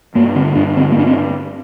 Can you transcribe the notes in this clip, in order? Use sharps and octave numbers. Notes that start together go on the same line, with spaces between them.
G2 A#3
D3 C4
G2 D4
D3 C4
A#3
G2 D4
C4